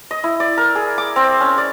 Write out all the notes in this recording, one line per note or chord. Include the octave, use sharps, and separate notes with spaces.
D#5
E4
D5
A#4
G#4
D6
C4
C#4
D5